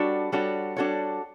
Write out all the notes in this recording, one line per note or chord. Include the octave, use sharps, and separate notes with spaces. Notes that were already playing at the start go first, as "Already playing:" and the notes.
Already playing: G3 D4 F#4 A4 C#5
G3 D4 F#4 A4 C#5
G3 D4 F#4 A4 C#5